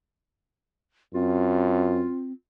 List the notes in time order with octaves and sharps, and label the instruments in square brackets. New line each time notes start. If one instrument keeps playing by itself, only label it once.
[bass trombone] F#2 [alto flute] C4 [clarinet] F4